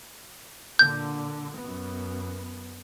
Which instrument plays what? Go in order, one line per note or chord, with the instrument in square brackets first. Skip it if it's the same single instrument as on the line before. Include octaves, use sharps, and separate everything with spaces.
[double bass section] A#2 D3 [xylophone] G6
[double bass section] F#2 B3